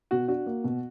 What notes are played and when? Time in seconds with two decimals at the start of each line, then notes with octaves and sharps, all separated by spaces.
0.11 B2 F#4
0.28 D4 F#4
0.46 A#3
0.64 B2